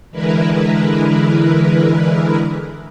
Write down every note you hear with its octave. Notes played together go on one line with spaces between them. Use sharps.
D3 E3 G#3 E4 A#4 B4